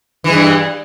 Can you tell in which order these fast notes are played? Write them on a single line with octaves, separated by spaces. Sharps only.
E3 G#3 G2